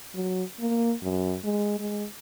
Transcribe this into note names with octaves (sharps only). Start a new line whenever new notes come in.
F#3
A#3
F#2
G#3
G#3